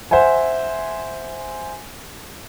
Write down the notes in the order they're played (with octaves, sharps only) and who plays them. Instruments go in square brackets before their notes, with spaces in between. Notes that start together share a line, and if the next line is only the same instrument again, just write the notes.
[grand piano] C5 E5 F#5 G#5